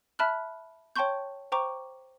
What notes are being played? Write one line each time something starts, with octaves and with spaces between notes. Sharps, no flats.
E5 A5 B5 F6 F#6
C#5 G5 A5 C6 C#6 G6
C5 G5 A#5 C#6 D6